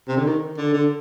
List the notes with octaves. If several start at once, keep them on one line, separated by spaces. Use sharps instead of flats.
C3
D3
D#3
D3
D3